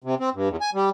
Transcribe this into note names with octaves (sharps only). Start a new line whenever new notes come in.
C3
C4
G2
E2
G#5
G3